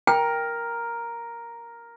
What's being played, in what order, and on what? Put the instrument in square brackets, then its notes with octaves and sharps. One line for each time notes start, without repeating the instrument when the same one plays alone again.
[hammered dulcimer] A#4 [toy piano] G5